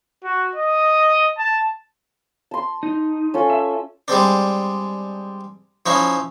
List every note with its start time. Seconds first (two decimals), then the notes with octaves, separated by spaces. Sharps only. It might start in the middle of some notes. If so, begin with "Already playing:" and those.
0.24 F#4
0.55 D#5
1.38 A5
2.51 A5 C6
2.83 D#4
3.34 C#4 F4 A4
3.50 E5
4.08 G3 G#3 C4 D4
5.86 F3 C#4 D#4 E4